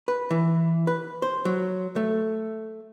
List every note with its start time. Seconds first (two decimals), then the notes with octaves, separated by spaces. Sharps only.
0.08 B4
0.31 E3
0.87 B4
1.22 C5
1.45 F#3
1.96 A3